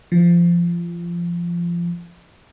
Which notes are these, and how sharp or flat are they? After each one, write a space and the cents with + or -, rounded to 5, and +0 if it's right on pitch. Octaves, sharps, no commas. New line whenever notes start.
F3 -20